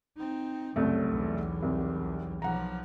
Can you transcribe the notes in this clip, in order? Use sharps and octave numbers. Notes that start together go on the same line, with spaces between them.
C4 D#4
C2 F#2 C#3 A3
B1 E2
C2
B1 F3 F#5 A#5